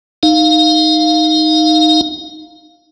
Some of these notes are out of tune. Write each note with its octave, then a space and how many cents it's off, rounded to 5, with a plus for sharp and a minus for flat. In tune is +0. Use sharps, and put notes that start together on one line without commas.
D#4 +0 F5 +0